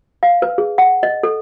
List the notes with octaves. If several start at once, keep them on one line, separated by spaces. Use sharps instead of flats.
F5
B4
G#4
F#5
D#5
A4